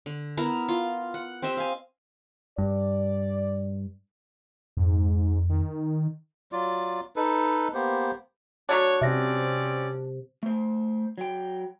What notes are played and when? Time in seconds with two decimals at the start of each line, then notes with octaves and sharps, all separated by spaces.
0.06 D3
0.37 B3 E4 A#4 A#5
0.69 F4
1.14 F#5
1.42 C4 G4 D#5 E5
1.57 F5 G#5
2.58 G2 D5
4.77 F2 G#2
5.49 D#3
6.52 F#3 F4 D5
7.16 D#4 A4 B4
7.74 A#3 B3 G4 C5
8.69 F#3 A3 D4 C#5
9.02 C3 C4 C#4 D5 E5 A#6
10.43 A3 C5
11.18 F#3 G5